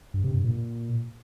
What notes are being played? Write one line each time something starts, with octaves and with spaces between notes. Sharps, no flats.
G2
C3
G2
A#2